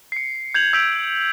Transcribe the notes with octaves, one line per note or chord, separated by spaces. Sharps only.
C7 C#7
G6 G#6 F7 F#7
E6 G6 B6 D7 F7